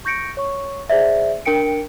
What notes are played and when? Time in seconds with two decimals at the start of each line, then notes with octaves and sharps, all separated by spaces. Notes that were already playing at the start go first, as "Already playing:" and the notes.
0.05 C#6 G6 A#6 C#7 D7
0.37 C#5 C#6
0.90 G#4 C5 D5 E5
1.45 D4 A#4 G5 C#7 D7